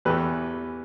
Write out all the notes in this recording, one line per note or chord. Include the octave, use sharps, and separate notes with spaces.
E2 E3 A3 G4 B4